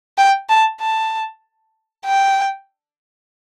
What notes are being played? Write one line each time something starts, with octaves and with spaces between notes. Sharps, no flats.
G5
A5
A5
G5